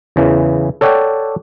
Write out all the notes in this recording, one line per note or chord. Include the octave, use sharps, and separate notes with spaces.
E2 C#3 E3
A4 C#5 D5 F#5 G5